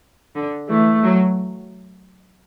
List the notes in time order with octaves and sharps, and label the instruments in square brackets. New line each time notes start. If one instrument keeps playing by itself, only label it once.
[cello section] D3
[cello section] E3 [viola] A3
[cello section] F#3